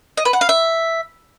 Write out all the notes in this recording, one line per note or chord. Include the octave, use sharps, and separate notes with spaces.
D#5
B4
F#5
F5
E5